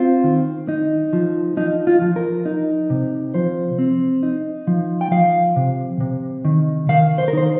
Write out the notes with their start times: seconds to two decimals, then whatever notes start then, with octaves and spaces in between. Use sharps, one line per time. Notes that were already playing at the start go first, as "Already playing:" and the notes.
Already playing: C4 F4
0.24 D#3
0.68 D#4
1.13 F3
1.57 F3 D#4
1.87 F4
2.01 F3
2.16 A#4
2.46 D#4
2.90 C3
3.34 F3 C5
3.79 C4
4.23 D#4
4.67 F3
5.01 G5
5.11 F3 F5
5.56 C3
6.01 C3
6.45 D#3
6.89 D#3 F5
7.18 C5
7.28 A#4
7.33 D#4 C5